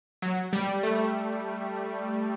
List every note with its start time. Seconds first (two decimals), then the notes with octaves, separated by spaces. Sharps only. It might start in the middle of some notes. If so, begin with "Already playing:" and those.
0.22 F#3
0.53 G3
0.83 A3